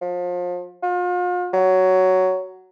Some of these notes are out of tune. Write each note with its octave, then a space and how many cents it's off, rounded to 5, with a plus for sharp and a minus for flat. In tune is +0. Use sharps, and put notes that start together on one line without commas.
F3 +30
F4 +40
F#3 +10